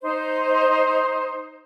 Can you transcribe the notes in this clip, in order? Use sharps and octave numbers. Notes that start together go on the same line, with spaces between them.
D#4 C5